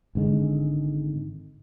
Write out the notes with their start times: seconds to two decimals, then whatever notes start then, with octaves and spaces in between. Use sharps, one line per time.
0.15 G#1 G#2 D3 G#3